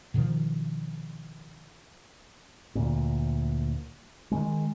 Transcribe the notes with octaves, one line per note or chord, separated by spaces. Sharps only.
B2 D#3 F3
D2 A#2
D#3 G#3